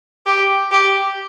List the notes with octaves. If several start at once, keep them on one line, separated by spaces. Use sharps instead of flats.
G4
G4